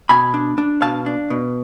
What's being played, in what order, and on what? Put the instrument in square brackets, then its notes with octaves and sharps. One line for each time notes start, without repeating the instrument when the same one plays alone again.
[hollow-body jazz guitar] B2 G#5 B5
D4
D4
B2 F5 A5
D4
B2